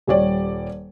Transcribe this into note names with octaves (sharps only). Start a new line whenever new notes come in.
D#1 G3 C#5 D5